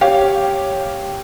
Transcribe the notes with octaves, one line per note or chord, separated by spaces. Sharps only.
G4 C#5 F5